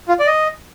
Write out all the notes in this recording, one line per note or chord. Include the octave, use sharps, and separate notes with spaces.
F4
D5
D#5